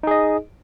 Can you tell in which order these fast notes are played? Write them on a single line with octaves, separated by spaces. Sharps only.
D#4 G#4 D#5